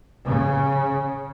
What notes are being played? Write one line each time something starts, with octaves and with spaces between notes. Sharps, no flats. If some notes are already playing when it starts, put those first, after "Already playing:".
C#3